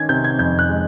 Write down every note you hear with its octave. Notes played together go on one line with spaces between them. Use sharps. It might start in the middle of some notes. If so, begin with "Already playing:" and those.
Already playing: D#3 C#4 G#6
C3 G6
G#6
F2 G6
F#6
G#3